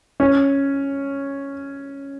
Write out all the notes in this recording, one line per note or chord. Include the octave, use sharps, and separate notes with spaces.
C#4